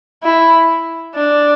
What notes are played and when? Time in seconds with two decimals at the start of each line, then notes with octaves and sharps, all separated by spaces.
0.23 E4
1.15 D4